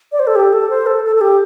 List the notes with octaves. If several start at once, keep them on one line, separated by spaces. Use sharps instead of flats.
D5
C5
A4
G4
A4
C5
A4
A4
A4
G4